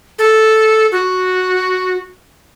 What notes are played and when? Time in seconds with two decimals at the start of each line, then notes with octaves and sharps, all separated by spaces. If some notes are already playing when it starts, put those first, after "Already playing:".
0.19 A4
0.92 F#4